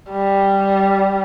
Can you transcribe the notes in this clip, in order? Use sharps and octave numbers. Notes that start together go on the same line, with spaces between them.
G3